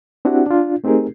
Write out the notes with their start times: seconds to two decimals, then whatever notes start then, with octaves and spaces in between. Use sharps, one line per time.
0.25 C4 D4 E4 F#4 G4 F#5
0.46 D4 F4
0.84 A3 C4 D#4 G4 G#4 A#4